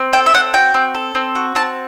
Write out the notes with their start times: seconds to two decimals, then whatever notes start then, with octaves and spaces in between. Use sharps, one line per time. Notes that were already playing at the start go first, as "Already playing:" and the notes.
Already playing: C4
0.13 A4 G5
0.26 E5
0.34 C4 F#5
0.53 F#4 G5
0.74 C4
0.95 A4
1.15 C4
1.35 F#4
1.55 C4 A5